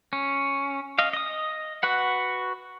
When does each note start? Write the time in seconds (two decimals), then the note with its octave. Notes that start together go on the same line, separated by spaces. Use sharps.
0.13 C#4
0.99 D#5 F5
1.13 D#5 D#6
1.83 F#4 B4 F#5